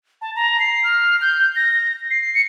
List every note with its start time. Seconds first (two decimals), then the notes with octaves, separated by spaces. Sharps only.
0.22 A5
0.36 A#5
0.60 C7
0.84 F6
1.21 G6
1.55 A#6
2.10 C7
2.35 C#7